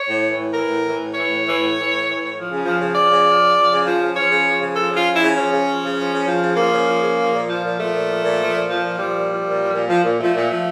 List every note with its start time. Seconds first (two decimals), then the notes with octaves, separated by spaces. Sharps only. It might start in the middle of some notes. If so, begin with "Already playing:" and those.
Already playing: C#5
0.09 A2
0.23 E3
0.38 A2
0.53 E3 A#4
0.69 A2
0.84 E3
0.99 A2
1.14 E3 C#5
1.29 A2
1.44 E3
1.59 A2
1.75 E3
1.89 A2
2.05 E3
2.19 A2
2.35 F3
2.50 C#3
2.65 F3
2.80 C#3
2.95 F3 D5
3.10 C#3
3.26 F3
3.40 C#3
3.55 F3
3.71 C#3
3.85 F3
4.00 C#3
4.15 F3 C#5
4.30 C#3
4.46 F3
4.61 C#3
4.76 F3 A4
4.91 C#3
4.97 F4
5.07 F3
5.16 E4
5.21 C#3
5.36 F3 C#4
5.52 C#3
5.67 F3
5.82 C#3
5.96 F3
6.12 C#3
6.27 F3
6.42 C#3
6.57 F3 A#3
6.72 C#3
6.87 F3
7.02 C#3
7.18 F3
7.32 A#2
7.48 F3
7.63 A#2
7.78 F3 A3
7.93 A#2
8.08 F3
8.23 A#2
8.39 F3
8.54 A#2
8.69 F3
8.83 A#2
8.98 F3 G3
9.14 A#2
9.29 F3
9.44 A#2
9.58 F3
9.74 A#2
9.89 F3
10.04 A#2
10.20 F3 A3
10.35 A#2
10.49 F3